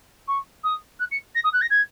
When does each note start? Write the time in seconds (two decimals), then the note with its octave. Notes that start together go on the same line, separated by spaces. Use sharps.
0.28 C#6
0.64 D#6
0.99 F#6
1.11 C#7
1.35 A#6
1.44 D#6
1.53 F#6
1.61 A#6
1.70 G#6